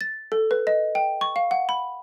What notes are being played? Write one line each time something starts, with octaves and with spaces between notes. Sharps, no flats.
A6
A4
B4
D#5
G5
C#6
F5
F#5
B5